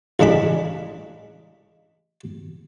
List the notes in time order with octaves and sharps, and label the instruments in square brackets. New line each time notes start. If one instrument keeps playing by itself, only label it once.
[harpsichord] A1 C#3 G#3 D4 B5